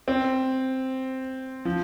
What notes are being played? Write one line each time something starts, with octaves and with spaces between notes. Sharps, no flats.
C4
F3